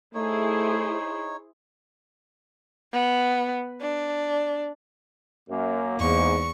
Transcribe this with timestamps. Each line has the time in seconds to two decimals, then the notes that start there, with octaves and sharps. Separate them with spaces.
0.14 A3 D#4 E4 G#4 C5 C#5
2.93 B3
3.81 D4
5.49 F#2 A#3
5.99 E2 G#2 C#6